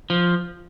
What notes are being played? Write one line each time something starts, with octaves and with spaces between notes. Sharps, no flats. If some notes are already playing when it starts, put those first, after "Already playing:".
F3